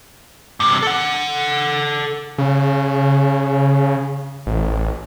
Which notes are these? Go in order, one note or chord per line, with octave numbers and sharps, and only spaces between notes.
G2 C3
A4 F#5
C#3
A1